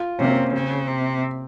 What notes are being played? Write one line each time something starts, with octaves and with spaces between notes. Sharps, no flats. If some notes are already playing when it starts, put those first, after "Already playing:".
Already playing: F4
C3 C#4
A#3
C4
C#3 C4
C3